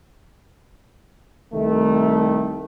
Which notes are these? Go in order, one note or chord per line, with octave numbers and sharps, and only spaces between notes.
C2 D#3 A3